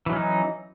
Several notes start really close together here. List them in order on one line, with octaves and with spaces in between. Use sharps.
E3 F#3 C#4 D#4